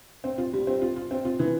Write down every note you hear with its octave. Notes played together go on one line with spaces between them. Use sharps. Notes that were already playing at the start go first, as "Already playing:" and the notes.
C4
F4
G3
C4
F4
F4
C4
F4
E3